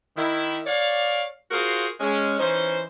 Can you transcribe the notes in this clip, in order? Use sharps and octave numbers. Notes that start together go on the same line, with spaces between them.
D#3 E4
C#5 D5 F5
F4 F#4 G#4 A#4 C5 F5
G#3 C#4
E3 C#4 D#4 C5